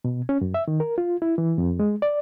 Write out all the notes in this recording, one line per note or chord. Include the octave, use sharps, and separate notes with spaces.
B2
C#4
F#2
E5
D#3
A#4
F4
E4
E3
F2
G#3
D5